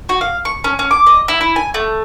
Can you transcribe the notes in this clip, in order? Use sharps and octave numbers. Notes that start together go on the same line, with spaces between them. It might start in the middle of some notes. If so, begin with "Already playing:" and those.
F#4
F5
C#6
C#4
C#4
D6
D#5
E4
E4
G#5
A3